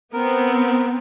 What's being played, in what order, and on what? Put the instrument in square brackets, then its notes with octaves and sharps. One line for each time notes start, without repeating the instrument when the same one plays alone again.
[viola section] B3 C4 [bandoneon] A#4